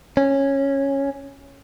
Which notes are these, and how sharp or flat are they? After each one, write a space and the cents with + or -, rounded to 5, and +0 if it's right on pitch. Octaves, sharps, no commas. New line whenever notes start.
C#4 -10